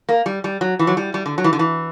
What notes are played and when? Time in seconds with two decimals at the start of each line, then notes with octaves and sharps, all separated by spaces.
0.09 A#3
0.26 G3
0.44 G3
0.61 F#3
0.79 E3
0.87 F#3
0.97 G3
1.14 G3
1.26 D3
1.38 F#3
1.44 E3
1.53 D3
1.59 E3